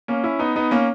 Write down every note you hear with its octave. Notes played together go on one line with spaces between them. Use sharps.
A#3 C#4
C#4 E4
B3 D#4
B3 D#4
A#3 C#4